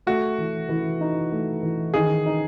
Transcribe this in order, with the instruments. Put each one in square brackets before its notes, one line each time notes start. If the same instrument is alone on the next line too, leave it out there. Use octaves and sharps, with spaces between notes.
[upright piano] A3 [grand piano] F#4
[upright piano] E3
E3
D#4
A3
E3
[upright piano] D#3 [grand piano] G#4
[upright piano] D#4